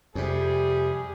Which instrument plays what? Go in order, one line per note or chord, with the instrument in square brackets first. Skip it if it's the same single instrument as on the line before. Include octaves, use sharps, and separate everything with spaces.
[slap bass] F2 C3 [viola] G3 G4 [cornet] G#4